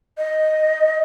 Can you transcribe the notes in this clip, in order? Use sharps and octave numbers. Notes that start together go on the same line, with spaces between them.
D#5